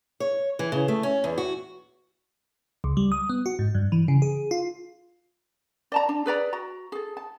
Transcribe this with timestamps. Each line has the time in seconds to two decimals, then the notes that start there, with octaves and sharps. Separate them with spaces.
0.20 C#5
0.59 E3
0.72 C#3
0.88 A3
1.03 C#4
1.24 E2
1.38 F#4
2.84 C#2
2.97 G3
3.12 D#6
3.30 B3
3.46 F#4
3.59 G#2
3.75 G2
3.92 E3
4.08 C#3
4.22 G#4
4.51 F4
5.92 D5 A5 A#5
6.09 D4
6.26 G#4 B4 D5 A#5
6.53 F#4 A#5
6.92 G#4 A4
7.17 A5